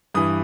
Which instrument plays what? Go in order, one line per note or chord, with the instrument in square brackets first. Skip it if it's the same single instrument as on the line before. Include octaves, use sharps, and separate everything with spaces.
[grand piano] G2 E3 D#6